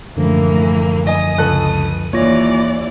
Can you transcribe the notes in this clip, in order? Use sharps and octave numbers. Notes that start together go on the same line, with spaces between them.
F#2 A2 D3 E3 F3 A#3
D#5 G#5 D#6
C#2 A4 F#6
D#2 E3 A#3 F4 C#5 D5 A#6